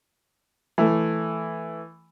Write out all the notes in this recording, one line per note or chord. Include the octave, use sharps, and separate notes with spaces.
E3 A3